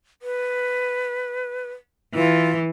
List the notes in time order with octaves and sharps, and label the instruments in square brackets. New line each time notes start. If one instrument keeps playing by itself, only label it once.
[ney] B4
[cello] E3 [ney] F4